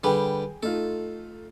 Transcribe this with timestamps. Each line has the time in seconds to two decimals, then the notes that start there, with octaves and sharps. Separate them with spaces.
0.04 D3 G3 G#4 B4 G5
0.63 A3 D#4 F4 A4